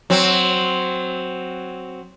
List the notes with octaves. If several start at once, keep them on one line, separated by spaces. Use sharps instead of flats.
F#3 C4